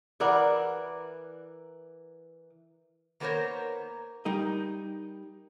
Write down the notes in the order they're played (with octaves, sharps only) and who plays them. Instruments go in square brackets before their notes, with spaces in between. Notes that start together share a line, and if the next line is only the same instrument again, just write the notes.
[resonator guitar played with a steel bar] E3 A#4 D5 F#5
D#3 A#3 B3 A#4 C5 C#5
[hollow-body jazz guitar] G3 D#4 A#4 D#5